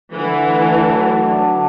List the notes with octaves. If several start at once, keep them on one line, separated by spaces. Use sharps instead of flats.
D3 E3
A3
F#3
D4
D3